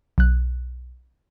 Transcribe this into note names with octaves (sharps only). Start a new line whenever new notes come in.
B1 F#6